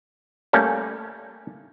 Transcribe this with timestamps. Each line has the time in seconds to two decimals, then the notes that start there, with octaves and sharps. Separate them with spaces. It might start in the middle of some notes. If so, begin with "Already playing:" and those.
0.53 G3 A3 A#3 C#4 A4